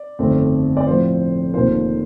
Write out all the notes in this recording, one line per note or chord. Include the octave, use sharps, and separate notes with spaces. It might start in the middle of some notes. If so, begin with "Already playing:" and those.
Already playing: D5
G1 F2 D#3 A3 C4
D5
A2 F3 C4 F4 C5
F1 D#2 D#3 A#3 F4 C5